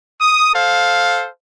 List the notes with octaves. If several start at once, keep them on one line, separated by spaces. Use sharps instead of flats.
D#6
A4 C5 F5